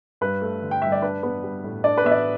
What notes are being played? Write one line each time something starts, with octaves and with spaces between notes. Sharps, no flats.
G2 B4
A3
D3
G5
G2 E5
D5
D4 B4
B3
G3
A2
D4 D5
B4
B3 E5
D5